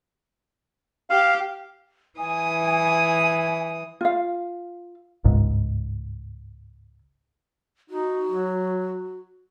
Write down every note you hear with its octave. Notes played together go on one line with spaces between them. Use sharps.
G4 F5
E3 G#5 D#6
F4 F5
G1 C#2 G#2
D#4 F#4
F#3